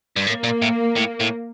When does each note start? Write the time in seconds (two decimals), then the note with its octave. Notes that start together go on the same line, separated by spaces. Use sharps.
0.16 G2
0.27 A2 A#3
0.44 A#2
0.62 A2
0.97 A2
1.21 A2